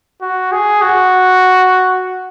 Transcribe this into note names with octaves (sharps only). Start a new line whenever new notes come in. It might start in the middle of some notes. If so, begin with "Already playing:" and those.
F#4
G#4
F#4